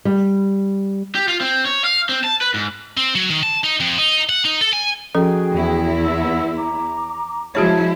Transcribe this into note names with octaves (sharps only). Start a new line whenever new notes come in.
G3
G4
F4
C4
C#5
F5
C4
A5
B4
G#2
C4
F#3
D#3
A5
D#4
F2
D#4
F#5
D#4
A4
G#5
F3 C#4 F#4 G#4 A4 G5
E2 E4
F#5 E6
A#5 D6
F3 G#3 E4 F#4 G#4 C#5 A5 G#6